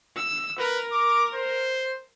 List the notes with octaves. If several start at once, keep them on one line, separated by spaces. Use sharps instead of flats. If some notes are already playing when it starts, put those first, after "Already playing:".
E6
A#4 B4
D6
C5